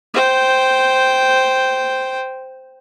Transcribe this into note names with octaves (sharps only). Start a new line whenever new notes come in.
C5 G5